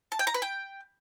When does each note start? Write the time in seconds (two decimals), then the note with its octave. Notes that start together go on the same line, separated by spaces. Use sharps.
0.12 A5
0.19 G5
0.27 A#5
0.34 B4
0.42 G5